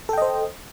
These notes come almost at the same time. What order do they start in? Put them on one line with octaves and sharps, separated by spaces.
A4 G5 D#5 C5